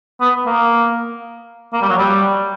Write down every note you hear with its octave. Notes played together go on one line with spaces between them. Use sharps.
B3
A#3
A#3
G3
F#3
G3